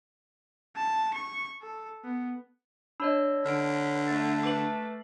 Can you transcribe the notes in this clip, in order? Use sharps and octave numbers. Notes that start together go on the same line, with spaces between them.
A5
C#6
A4
B3
D4 C#5 D#5 B5 E6
D3 B4 F6 D7
A3 A6
B4 D6 C7 F#7